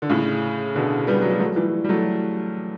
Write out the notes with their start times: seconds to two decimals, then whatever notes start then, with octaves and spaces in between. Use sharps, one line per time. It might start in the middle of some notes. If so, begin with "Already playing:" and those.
0.02 D3
0.09 A2 C#3
0.75 B2 D3
1.07 G3 B3
1.22 F#3
1.31 G3
1.39 F#3 A3
1.56 E3 G3
1.84 G3
1.89 F#3 A3